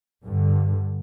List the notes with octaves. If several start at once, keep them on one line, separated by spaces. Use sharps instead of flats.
G2 D3